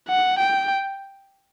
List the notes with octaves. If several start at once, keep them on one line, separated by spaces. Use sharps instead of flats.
F#5
G5